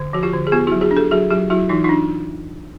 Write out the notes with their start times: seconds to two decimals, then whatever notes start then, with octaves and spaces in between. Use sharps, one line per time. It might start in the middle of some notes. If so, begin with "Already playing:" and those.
Already playing: D3
0.13 F3 F#4
0.23 F4 G4
0.33 D3
0.47 G#4
0.52 B3 F4 G4
0.67 F#3 E4 F#4
0.81 F#4 G#4
0.91 D4
0.97 G4 A4
1.11 F#3 F#4 G#4
1.30 F#3 F4 G4
1.50 F#3 E4 F#4
1.69 E3 D#4 F4
1.84 D4 D#4 F4